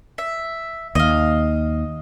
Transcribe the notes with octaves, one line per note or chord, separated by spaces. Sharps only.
E5
D#2 D#5 F5